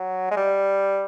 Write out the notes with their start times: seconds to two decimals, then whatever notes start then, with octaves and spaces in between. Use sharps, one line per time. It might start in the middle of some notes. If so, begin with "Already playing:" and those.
Already playing: F#3
0.31 G#3
0.37 G3